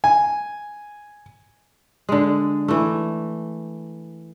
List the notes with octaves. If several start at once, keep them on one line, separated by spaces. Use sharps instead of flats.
G#5
D3 G#3
E3 A3